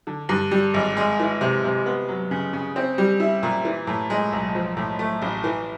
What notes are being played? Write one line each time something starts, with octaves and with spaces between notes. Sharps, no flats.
D3
G2
G3
G#1
G#3
E3
C3
C3
B3
F#3
C#3
C#3
C4
G3
E4
A#2
E3
A2
G#3
B1
F3
A2
A3
A1
E3